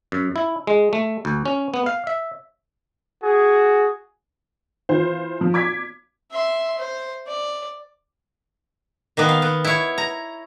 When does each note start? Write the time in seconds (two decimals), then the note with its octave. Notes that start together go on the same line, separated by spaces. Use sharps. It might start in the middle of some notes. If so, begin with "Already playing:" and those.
0.12 F#2
0.36 E4
0.67 G#3
0.93 A3
1.25 D2
1.46 C#4
1.74 B3
1.86 F5
2.07 E5
3.23 F#4 G#4
4.89 E3 F4 C5
5.41 F3
5.54 D6 G#6 B6
6.31 E5 C6
6.78 C5
7.27 D5
9.17 D#3 A#3 B3
9.29 F5
9.42 B3
9.64 E4 C#5
9.98 A#5